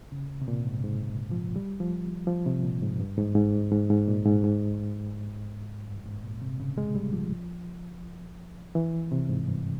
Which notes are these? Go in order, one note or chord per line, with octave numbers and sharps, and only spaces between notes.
C#3
C3
A#2
G#2
G#2
F3
G3
F3
F3
C3
A#2
G#2
G2
G#2
G#2
G#2
G#2
A#2
G#2
G#2
G2
G#2
A#2
C3
C#3
G#3
G3
F3
E3
C3
G#2
G2